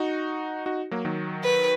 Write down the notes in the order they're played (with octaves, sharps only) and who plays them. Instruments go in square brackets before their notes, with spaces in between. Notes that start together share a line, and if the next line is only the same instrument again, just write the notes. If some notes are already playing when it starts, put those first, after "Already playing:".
Already playing: [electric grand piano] D#4 F#4
D#4 F#4
F#3 A#3
D#3 F#3
[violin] B4